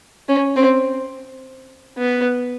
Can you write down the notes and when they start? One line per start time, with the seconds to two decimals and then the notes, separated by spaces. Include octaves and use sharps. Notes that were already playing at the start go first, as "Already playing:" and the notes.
0.29 C#4
0.57 C4
1.98 B3